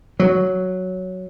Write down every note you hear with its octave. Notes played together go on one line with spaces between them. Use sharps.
F#3